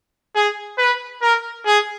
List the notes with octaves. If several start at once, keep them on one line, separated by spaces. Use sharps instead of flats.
G#4
B4
A#4
G#4